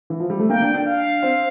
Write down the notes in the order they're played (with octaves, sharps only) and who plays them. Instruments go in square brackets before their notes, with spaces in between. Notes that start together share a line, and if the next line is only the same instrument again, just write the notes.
[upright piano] E3
F3
G3
A3
[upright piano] A#3 [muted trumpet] G5
[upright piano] D4
D4
[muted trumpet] F5
[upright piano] C4